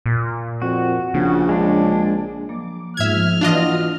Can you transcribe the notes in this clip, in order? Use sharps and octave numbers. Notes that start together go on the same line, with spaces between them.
A#2
F2 F#4
A#1 C#3
G#3 D4
F3 F#3 A#3 D6
G#2 F3 A#3 B3 E5 F6 G#6
E3 D4 F4 F#4 D#5